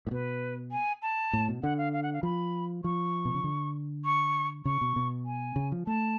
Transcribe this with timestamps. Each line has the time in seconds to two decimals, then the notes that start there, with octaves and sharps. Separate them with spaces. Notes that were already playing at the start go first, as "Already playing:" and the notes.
0.07 A2
0.11 B2 B4
0.72 G#5
1.02 A5
1.33 A2
1.48 B2
1.63 D3 F#5
1.78 F5
1.93 F5
2.03 F#5
2.14 F5
2.23 F3 B5
2.84 F3 C#6
3.25 B2
3.35 C#3
3.44 D3
4.05 C#6
4.65 C#3 C#6
4.81 B2
4.96 B2
5.26 G#5
5.56 C#3
5.72 F3
5.87 A3 A5